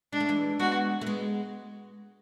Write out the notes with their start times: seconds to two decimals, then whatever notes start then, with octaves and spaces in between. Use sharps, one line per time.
0.13 G#3 D4
0.20 A3
0.29 E3 G#3
0.59 G#3 B3 F#4
1.01 A3
1.07 G#3 B3